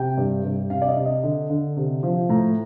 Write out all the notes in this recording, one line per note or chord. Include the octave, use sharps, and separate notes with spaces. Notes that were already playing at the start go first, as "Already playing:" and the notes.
Already playing: C3 G5
G2
G2
C3 F5
D5
D#5
C3
D#5
D3
D3
C3
F3
A2 A#5